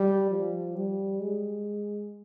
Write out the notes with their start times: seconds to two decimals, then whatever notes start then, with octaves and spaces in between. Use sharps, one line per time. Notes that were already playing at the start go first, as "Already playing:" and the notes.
Already playing: G3
0.31 F3
0.76 G3
1.21 G#3